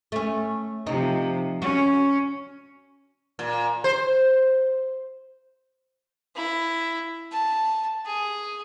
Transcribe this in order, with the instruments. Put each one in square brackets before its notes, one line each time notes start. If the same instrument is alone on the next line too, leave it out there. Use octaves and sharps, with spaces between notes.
[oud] A3 C#4
[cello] C3 F3 [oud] D#4
[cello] C#4 [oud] F#4
[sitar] A#2
C5
[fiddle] E4
A5
G#4